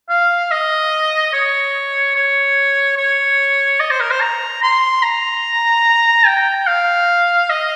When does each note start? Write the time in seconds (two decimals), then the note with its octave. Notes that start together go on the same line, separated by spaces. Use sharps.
0.10 F5
0.51 D#5
1.33 C#5
2.16 C#5
2.98 C#5
3.80 D#5
3.91 C5
4.00 A#4
4.11 C5
4.21 A#5
4.63 C6
5.03 A#5
6.26 G5
6.67 F5
7.50 D#5